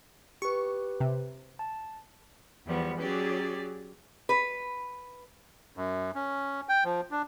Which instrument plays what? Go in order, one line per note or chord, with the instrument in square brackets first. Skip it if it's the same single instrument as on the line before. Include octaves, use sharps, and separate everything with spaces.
[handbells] G4 B4 [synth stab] C#6
[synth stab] C3
[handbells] A5
[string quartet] E2 E3 F3 G3 B3
F#3 C#4 G4 G#4 D5
[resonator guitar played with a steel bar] B4
[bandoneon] F#2
C#4
G5
F3
D4